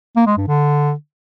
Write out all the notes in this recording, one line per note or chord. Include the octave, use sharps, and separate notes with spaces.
A#3
G#3
G2
D3